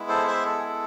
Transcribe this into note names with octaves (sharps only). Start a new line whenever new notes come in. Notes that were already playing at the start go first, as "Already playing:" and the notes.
Already playing: G#3 B3 E4
A4 C5
C5 E5
A4
G#4
A4